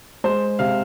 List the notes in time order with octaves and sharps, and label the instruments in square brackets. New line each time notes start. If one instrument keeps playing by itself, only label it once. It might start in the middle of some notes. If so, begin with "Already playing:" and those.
[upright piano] G#3 C5
C3 F5